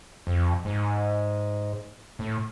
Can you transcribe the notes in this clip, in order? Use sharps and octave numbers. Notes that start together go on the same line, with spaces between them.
F2
G#2
A2